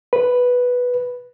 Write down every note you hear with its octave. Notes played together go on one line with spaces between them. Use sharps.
B4